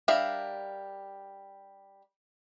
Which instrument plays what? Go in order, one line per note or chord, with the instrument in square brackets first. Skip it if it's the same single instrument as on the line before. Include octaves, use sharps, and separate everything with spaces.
[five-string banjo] G3 D4 A#4 E5 F5